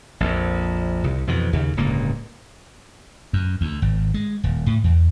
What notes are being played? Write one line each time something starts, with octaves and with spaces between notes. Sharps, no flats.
A#1 F2
C2
F2 B2 E3
D#2 C#3
D1 C#2 G2 A#3
F#2
D2
G#1
G#3
D#1
A2
E2